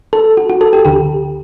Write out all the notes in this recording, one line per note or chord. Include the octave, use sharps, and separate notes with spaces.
A4
F#4
F#4
A4
G4
D2 D3 G4